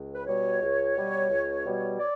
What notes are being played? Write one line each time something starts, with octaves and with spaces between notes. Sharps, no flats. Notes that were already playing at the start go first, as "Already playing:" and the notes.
Already playing: C#2
B4
B2 G3 C#5
C#2
B2 G3
C#2
B2 G3
D5